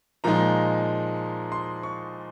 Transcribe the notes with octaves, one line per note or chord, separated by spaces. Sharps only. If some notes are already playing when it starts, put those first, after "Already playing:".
A#2 F3 G#3 D#4 A#5
C6
C#6